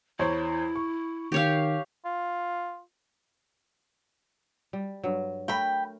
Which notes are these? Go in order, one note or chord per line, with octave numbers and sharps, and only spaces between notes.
E2 E4 C5 C#5
C#6
D#3 G4 C#5 F5
F4
G3
G2 F#3
A3 A#4 G5 B5